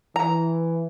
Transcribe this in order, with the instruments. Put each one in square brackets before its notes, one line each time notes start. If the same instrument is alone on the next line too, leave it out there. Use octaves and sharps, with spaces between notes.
[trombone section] E3 [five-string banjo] A#5